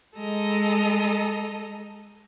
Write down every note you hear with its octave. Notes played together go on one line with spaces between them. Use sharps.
G#3 A4 D#5 A#5